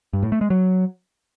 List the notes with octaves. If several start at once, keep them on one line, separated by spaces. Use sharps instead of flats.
G2
A2
A3
G#3
F#3